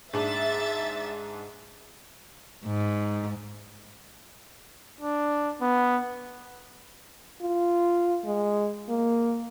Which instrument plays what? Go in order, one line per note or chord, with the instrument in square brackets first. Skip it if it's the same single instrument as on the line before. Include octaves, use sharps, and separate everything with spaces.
[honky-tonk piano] G#2 D4 [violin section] E5 A6
[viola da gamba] G#2
[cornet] D4
B3
[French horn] F4
G#3
A#3